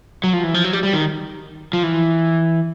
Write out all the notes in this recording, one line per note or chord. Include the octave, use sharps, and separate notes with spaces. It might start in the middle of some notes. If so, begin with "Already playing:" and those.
F#3
F3
E3
F3
F#3
G3
G3
D#3
F3
E3